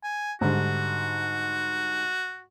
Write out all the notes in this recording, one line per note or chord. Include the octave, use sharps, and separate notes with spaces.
G#5
G#2 D3 G3 F#4